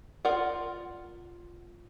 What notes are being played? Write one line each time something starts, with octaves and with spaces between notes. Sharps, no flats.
F4 A#4 D5 F#5